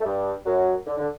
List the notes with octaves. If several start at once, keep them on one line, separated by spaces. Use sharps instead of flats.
A3
G2 G3
F#2 F#3
D3
D3